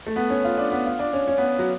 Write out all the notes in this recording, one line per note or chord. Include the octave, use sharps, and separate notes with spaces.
A3
B3
C#4
F4
D4
B3
F4
D4
C#4
C#4
B3
F#3